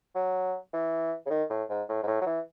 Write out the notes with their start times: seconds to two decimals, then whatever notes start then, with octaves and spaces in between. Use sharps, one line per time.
0.15 F#3
0.73 E3
1.26 C#3
1.30 D#3
1.50 A2
1.69 G#2
1.89 A2
2.03 G#2
2.07 A2
2.21 F#3
2.26 E3